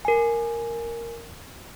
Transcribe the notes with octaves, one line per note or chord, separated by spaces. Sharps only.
A#4 G#5